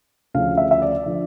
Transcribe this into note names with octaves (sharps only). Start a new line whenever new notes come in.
D2 C#3 F3 F5
E5
E5
D5
D3 F3